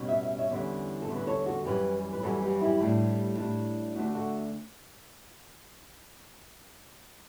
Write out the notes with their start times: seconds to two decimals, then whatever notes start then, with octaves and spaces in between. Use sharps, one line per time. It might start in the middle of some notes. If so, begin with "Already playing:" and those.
Already playing: B2 G3 C#4
0.08 E5
0.23 E5
0.38 C#5 E5
0.50 E2 D3 G3 C#4
1.02 A4
1.08 E2 D3 G3 C#4
1.15 B4
1.27 A4 C#5
1.46 F#4 A4
1.65 F#2 E3 G3 C#4 G4 B4
2.13 B4
2.22 F#2 E3 G3 C#4 F#4 A4
2.42 G4 B4
2.61 E4 G4
2.80 A2 G3 D4
3.38 A2 G3 D4
3.95 D2 D3 A3 D4 F#4
4.15 F#4 A4